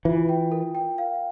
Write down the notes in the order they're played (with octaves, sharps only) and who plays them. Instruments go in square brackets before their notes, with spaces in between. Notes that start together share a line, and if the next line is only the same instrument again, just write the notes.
[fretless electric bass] E3 [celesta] F4
[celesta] G5
A#4
G5
F5